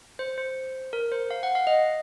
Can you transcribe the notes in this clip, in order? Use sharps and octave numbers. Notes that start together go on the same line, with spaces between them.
C5
C5
A#4
C5
F5
F#5
F5
D#5